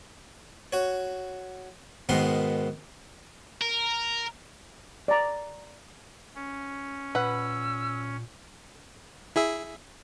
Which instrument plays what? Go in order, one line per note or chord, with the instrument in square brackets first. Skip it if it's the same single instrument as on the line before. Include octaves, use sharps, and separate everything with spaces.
[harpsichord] F#4 C#5
G#2 B2 D#3 B3 A#4 C6
[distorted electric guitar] A#4
[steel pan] D5 A#5
[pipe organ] C#4
[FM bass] A#2 [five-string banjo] B4 F#5 [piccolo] E6
[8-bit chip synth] E4 G#4 E5